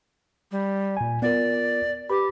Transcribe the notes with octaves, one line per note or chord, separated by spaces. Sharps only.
G3
A#2 G#5
B3 F4 A#4 D5
G4 B4 B5